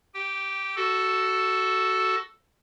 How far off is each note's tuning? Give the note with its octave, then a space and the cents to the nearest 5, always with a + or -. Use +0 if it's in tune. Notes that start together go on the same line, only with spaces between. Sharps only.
G4 -15 G5 +0
F#4 +20 A4 +0